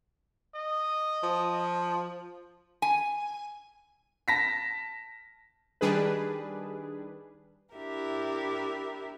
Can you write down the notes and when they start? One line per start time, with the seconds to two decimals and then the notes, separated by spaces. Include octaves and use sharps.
0.55 D#5
1.23 F3
2.82 G#5
4.28 A5 A#6 B6
5.81 D#3 G3 D4 G#4 B4
7.74 D4 E4 G4 A#4 E5